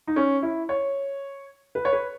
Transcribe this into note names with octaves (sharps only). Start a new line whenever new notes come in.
D#4
C#4
E4
C#5
B4
C#5
B4